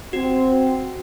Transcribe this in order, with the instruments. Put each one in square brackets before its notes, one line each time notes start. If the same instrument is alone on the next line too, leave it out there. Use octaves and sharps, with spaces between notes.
[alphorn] C4 [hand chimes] F#4